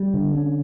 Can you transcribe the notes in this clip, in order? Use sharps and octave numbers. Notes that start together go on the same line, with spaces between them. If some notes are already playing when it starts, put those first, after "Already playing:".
Already playing: G3
D3
C#4